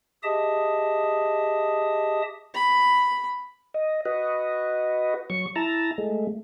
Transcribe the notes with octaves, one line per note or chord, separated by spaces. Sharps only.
G4 G#4 D#5 E5 A5 D#6
B5
D#5
F#4 B4 D#5
F#3 C#6
E4 A5 A#5
G#3 A3